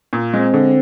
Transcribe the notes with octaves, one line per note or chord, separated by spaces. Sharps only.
A#2
G#3 C4
D3